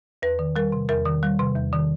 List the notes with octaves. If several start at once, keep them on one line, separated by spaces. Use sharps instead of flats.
E2 B4
D#3
G3 A#4
C3
E2 A#4
D#3
G3
C3
E2
D#3